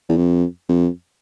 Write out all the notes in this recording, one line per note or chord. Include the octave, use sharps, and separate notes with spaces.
E2
F2
F2